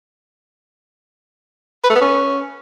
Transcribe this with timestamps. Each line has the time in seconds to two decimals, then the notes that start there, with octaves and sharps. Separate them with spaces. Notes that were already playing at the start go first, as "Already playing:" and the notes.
1.84 B4
1.90 A3
1.96 B3
2.01 C#4